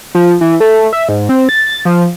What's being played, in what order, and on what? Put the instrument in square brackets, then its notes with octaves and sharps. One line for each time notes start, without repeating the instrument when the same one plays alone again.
[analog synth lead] F3
E3
A3
E5
G#2
C4
A6
F3